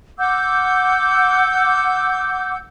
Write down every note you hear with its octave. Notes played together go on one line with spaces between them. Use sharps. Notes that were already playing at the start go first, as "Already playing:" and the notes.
F#5 D6 E6 G6